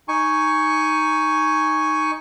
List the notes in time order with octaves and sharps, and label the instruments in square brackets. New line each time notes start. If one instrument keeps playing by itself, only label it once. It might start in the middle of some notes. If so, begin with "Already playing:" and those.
[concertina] D#4 G#5 C#6